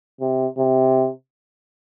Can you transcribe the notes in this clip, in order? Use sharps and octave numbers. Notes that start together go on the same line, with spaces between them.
C3
C3